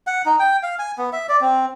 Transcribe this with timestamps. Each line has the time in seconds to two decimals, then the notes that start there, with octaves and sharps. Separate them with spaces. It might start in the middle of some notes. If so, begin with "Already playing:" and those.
0.07 F#5
0.26 D#4
0.39 G5
0.63 F5
0.79 G#5
0.98 B3
1.13 E5
1.29 D5
1.41 C4